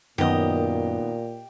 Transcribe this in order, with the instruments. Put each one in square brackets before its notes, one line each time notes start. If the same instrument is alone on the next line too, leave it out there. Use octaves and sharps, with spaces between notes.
[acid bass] F#2 [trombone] A#2 [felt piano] D#3 B3 [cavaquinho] G4 D#5